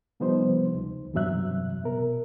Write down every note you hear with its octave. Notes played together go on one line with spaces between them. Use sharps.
C3 F3 G3 B3 D#4 C5
C#2
E2 G2 C3 F#3 E5 F#6
B2 A#4